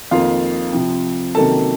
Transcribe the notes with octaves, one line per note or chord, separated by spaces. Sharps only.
F2 D#3 A#3 F4 F5
C3 F3 C4
C3 D#3 F#3 A#3 C#4 A4 A5